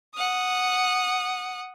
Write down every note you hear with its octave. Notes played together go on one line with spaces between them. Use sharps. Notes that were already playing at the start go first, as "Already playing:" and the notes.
F#5 D#6